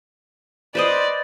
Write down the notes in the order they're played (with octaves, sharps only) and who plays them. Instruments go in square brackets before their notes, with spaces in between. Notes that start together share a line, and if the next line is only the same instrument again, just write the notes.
[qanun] B4 C5 D#5 [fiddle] D5